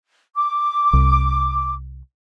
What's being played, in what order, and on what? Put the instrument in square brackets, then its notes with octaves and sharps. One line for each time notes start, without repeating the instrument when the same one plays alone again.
[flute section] D6
[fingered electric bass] C2